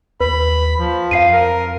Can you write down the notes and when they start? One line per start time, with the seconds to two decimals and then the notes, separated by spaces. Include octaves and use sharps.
0.20 D#2 B4 B5
0.79 F3
1.11 F2 F5 C7 D#7
1.33 A#4